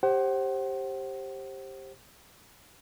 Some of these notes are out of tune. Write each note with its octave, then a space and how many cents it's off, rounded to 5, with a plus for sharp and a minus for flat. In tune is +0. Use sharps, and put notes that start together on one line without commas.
G4 +0 C5 +25 F#5 +35